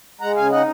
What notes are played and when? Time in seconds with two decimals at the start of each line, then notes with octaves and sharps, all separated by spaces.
0.21 G#3 F#5 A#5
0.36 C#3 F5 G#5
0.51 D#4 D#5 F#5